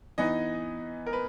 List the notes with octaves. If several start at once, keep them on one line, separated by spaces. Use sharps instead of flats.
E3 B3 D#4 D#5
A#4
B4